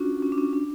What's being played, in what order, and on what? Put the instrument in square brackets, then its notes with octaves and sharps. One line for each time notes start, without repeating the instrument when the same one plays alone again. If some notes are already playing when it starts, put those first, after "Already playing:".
Already playing: [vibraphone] C#4 D4 F4 F#4
C#4
D4
C#4
D4